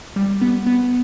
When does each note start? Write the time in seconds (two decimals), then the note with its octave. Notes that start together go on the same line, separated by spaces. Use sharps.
0.16 G3
0.41 B3
0.66 B3